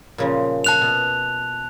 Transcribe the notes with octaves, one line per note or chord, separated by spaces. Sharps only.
A#2 C#3 F3
A5 F#6 F7
B2